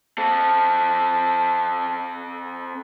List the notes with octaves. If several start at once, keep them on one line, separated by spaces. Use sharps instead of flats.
C4 A4